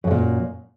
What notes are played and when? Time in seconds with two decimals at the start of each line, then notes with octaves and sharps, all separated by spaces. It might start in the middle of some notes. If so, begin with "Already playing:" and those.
0.04 F#2
0.07 C#3
0.11 A#2